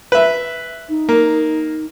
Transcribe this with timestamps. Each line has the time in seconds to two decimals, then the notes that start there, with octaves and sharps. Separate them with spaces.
0.12 B4 E5
0.89 D#4
1.09 A#3